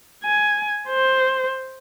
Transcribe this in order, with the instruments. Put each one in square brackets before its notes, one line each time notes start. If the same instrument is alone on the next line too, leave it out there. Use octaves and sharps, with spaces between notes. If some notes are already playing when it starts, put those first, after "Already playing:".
[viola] G#5
C5